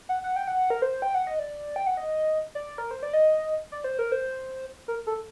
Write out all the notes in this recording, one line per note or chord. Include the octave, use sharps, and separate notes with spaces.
F#5
F#5
G5
F#5
A#4
C5
G5
F#5
D#5
D5
G5
F#5
D#5
D5
A#4
C5
D5
D#5
D5
C5
A#4
C5
A#4
A4